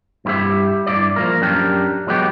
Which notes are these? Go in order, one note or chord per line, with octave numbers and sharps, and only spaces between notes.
G2 C4 E4 G4 E5
G2 E4 D5
F3 A#3 A#4
F#2 D4 G4 A#4
F#3 G#3 B3 G4